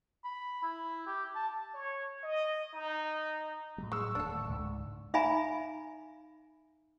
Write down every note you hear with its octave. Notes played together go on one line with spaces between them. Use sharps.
B5
E4
G4
A5
C#5
D#5
D#4
A2 F#3 G3
G#3 C#6 E6
D1 D#2 A3 D4 A4
C#2 G#2
D#4 E5 F5 G#5 A#5 B5